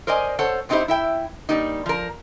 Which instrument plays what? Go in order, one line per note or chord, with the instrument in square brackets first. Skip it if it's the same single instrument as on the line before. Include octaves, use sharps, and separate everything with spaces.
[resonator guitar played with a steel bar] A#4 C5 D5 D#5 G#5
A4 C5 C#5 F#5 A5
A2 C4 D#4 E4 G4 C5
E4 E5 G5
G3 A#3 D#4
F3 A#4